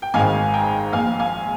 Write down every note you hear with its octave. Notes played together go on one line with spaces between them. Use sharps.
G5
G#1 G#2 D#3 F5 G#5
G5 A#5
A#1 A#2 F5 G#5
F5 G#5